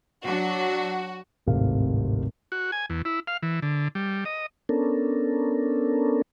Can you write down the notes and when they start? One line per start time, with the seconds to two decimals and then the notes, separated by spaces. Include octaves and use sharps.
0.25 F#3 D4 F#4
1.46 D1 G#1 C3 F5
2.52 F#4
2.72 G#5
2.90 E2
3.05 E4
3.27 F5
3.43 E3
3.62 D3
3.95 G3
4.25 D#5
4.69 B3 C#4 D4 A4 A#4